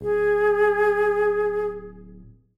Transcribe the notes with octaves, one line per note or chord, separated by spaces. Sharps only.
D1 G#4